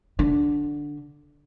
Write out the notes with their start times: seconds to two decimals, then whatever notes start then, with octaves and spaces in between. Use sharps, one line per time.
0.19 D3